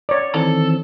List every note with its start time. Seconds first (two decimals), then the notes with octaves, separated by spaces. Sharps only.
0.09 C#5 D5
0.35 D#3 E3 C4 A4